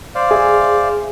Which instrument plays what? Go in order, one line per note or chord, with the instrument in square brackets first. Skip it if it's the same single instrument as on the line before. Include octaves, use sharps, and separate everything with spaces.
[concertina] C5 D5 F5
[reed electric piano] G#4 E5